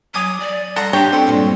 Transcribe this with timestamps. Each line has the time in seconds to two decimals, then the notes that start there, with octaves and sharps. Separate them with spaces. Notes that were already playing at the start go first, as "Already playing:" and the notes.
0.14 F#3 G#5 D6 D#6
0.40 D5
0.76 G3 A4 F#5 A#5 C6
0.93 D4 G4 C#5 G5
1.13 C4 A4
1.27 G2 A#2 G#3